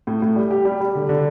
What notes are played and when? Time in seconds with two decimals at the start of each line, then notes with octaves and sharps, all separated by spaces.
0.07 A2
0.22 A2
0.36 G3
0.51 G4
0.65 G3
0.81 G3
0.95 D3
1.09 D3